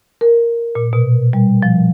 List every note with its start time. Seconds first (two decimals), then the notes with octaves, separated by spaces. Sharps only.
0.21 A#4
0.75 A#2
0.93 B2
1.33 G3
1.63 F3